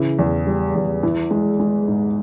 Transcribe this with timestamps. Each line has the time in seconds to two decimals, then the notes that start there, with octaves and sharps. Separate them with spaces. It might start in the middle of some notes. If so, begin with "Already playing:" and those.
Already playing: C#3 E3
0.19 E2
0.47 G3
0.75 E2
1.03 E3
1.31 G#3
1.60 G#3
1.88 G#2